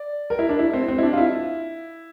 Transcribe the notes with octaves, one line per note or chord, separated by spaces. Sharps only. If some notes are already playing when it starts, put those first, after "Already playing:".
Already playing: D5
A#4
E4
D4
E4
C4
C4
E4
D4
F4
E4